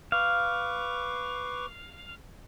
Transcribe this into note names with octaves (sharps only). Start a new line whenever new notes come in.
B4 F5 C#6 D6